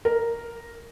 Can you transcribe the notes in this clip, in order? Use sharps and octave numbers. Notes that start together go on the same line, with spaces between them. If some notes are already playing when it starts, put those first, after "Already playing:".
A#4